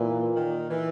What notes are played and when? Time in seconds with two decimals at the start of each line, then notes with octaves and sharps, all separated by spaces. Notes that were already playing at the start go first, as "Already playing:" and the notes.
Already playing: A#2 E3
0.36 D#3
0.70 E3